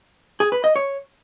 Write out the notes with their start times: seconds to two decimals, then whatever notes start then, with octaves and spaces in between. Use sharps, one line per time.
0.40 G#4
0.52 B4
0.64 D#5
0.76 C#5